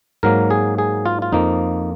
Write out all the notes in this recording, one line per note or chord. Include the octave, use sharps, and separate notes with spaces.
G#2 F#3 A#3 A#4
G#4
G#4
F4
F4
F2 F3 A#3 D#4